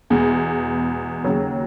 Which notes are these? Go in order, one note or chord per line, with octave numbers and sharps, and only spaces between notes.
E2 B2 G#3
D#2 C#3 F#3